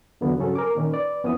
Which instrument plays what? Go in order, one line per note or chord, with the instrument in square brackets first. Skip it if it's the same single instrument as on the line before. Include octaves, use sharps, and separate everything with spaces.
[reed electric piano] E2 D3 F#3 B3
G2 C#3 F#3 C#4 A4
A#4 G#5 D6
A#2 D#3 C#4
B4 D5
F2 B3 C#4 E4 D#6